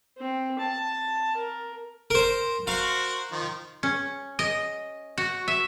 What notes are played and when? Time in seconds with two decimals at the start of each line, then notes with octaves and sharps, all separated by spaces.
0.18 C4
0.59 A5
1.37 A#4
2.10 A#4 C5
2.67 F#4 A#4 C5 F5
3.32 D#3 F3
3.83 C#4
4.39 D#5
5.18 F#4
5.48 E5